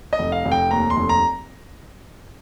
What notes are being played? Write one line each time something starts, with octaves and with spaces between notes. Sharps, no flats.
D#5
F1
F5
F1
G5
D#2 A#5
C6
F1
A#5